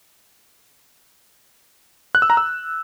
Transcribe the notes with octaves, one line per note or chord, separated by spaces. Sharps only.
F#6
E6
A#5
E6